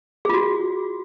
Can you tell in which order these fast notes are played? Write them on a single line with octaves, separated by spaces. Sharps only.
G#4 F4 F#4